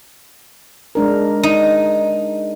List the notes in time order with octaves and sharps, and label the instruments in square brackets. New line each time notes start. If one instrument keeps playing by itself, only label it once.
[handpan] G#3 D4 A#4
[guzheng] D#4